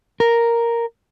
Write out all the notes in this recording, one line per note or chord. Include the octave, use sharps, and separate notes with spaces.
A#4